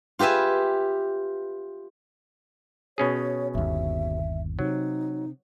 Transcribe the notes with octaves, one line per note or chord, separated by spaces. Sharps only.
F4 G4 B4 E5 G#5
B2 C#4 G#4 C#5
G1 D#2 E5
C3 F#3 D#4